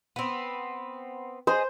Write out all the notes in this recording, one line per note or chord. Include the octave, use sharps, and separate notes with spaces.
B3 C4
G#4 C5 D#5